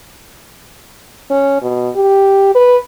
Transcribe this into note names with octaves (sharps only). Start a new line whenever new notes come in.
C#4
B2
G4
B4